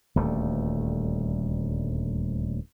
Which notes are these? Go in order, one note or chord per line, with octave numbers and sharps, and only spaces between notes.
D#1 D2 G3 A3